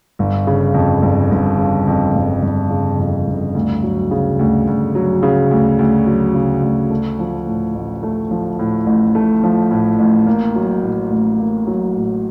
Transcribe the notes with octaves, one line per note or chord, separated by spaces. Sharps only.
G1
C#3
F2
G1
G1
C#3
F2
G1
G1
C#3
F2
G1
D2
F#3
C#3
D2
D2
F#3
C#3
D2
D2
F#3
C#3
D2
A3
F3
A2
A1
A3
F3
A2
A1
A3
F3
A2
A1
A#3
F#3
A2
A1
A#3
F#3
A2